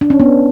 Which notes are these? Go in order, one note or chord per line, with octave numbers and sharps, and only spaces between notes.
D4
C#4
B3 D4